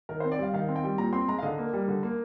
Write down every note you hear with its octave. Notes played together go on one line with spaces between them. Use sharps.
D#3 A#4
C4 C5
D5
G3 F5
D#3 F5
C4
G5
G3
A#2 A#5
C4 C6
G#3 A#5
F5
D3 D#5
A#3
G3
D3
A#3